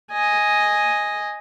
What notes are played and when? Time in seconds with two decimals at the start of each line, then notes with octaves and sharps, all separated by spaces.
0.11 D#5 G#5